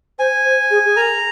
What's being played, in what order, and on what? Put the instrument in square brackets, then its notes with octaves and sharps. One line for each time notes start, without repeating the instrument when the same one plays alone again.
[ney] C5 [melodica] G#5
[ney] C5
G#4
G#4
[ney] A#4 [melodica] A#5